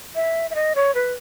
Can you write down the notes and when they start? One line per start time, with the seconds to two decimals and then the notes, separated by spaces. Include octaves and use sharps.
0.15 E5
0.51 E5
0.55 D#5
0.76 C#5
0.95 B4